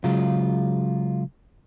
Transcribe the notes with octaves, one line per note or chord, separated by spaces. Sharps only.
C#3 F#3 G#3 F4